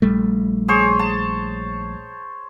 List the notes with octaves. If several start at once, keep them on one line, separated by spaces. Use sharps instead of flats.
A#1 G3 A3
G#4 C5 C#5
A5